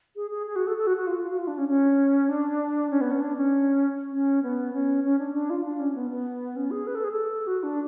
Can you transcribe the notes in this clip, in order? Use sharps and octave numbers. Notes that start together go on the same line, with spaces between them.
G#4
G#4
G#4
F#4
A4
A4
F#4
F#4
F4
F#4
F4
D4
C#4
C#4
D4
C#4
B3
C#4
D4
C#4
C#4
B3
C#4
C#4
D4
D4
F4
D4
C#4
B3
B3
C#4
G#4
B4
A4
G#4
A4
F#4
D4